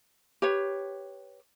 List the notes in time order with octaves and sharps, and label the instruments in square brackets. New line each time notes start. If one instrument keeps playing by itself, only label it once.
[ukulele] G4 B4 C#5